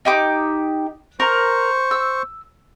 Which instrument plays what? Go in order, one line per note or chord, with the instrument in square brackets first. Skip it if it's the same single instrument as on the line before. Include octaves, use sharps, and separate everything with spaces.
[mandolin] D#4 G4 D6
[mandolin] A#4 [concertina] C5 C#6
[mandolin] E6